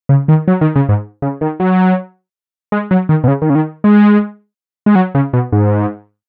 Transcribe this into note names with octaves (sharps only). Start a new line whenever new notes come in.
C#3
D#3
F#3
D#3
C#3
G#2
C#3
D#3
F#3
G#3
F#3
D#3
B2
C#3
D#3
C#3
D#3
G#3
G#3
F#3
C#3
B2
G#2